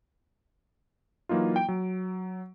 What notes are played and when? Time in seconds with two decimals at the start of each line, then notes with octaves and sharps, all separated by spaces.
1.29 E3 F#3 A#3 D#4 F4
1.56 G5 D7
1.68 F#3